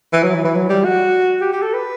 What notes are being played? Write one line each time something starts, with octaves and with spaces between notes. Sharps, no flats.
E3
F#3
E3
E3
F#3
G3
F#4
G4
G4
A4
B4